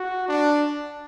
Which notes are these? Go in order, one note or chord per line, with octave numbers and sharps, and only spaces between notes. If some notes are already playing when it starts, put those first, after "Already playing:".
Already playing: F#4
D4